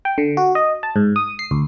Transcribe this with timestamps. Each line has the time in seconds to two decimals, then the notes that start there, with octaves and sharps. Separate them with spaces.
0.05 G5
0.18 D3
0.37 F#4
0.55 D#5
0.83 A5
0.96 G#2
1.16 D#6
1.39 C7
1.51 D2